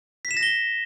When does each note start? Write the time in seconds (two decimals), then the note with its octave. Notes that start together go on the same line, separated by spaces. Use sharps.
0.25 B6
0.31 E7
0.37 A#6
0.43 G7